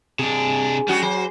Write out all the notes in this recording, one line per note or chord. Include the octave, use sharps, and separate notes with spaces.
C3 D4 G#4
G3 C#4 F#4 G#4 G5
F#3 C5